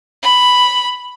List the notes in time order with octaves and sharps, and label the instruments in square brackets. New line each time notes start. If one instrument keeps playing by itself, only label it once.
[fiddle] B5